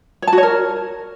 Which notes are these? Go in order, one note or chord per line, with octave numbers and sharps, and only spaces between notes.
C#5
A5
F#4
C#5
A#4